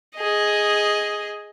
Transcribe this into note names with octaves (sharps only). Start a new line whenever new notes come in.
G#4 D#5